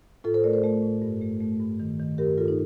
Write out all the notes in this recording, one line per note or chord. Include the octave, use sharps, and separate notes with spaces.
A2 F4 A4
A4 C5
A3 A#4 D5
A4 C5
A3
A2
G2
A3
A3
G2
D#3
D#3
G2 G4 A#4
G2 F4 A4
D#4